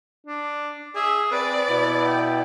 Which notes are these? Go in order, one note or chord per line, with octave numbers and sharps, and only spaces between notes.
D4
G#4 E5
C4 B4 D5
B2 B3 E4
G5